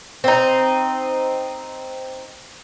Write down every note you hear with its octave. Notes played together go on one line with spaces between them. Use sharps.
C4 D#4